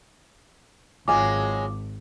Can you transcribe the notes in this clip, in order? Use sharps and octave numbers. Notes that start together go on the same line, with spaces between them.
G#1 F#3 G#3 C#4 F4 G#5 D6